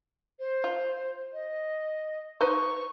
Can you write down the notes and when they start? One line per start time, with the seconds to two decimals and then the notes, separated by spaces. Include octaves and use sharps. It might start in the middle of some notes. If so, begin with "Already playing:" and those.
0.39 C5
0.64 F4
1.33 D#5
2.41 D#4 B4 C5 C#6